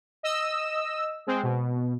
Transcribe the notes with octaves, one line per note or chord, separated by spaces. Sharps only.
D#5 E6
G#3 C4
B2